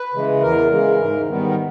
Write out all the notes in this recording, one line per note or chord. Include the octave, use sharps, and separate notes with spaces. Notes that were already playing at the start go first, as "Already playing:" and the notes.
Already playing: B4
C#3 E3 G#3
E2 A#4
C#3 E3 G#3
G#2
D#3 G3 B3
A#4